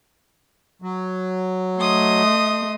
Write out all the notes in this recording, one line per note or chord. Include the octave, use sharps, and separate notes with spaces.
F#3
A3 D#5 C6 D#6